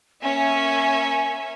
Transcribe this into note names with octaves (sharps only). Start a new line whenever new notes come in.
A#3 C#4 E5 G#5